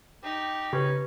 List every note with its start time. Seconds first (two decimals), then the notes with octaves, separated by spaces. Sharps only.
0.24 D#4 G4
0.73 C#3 C#4 G4 B4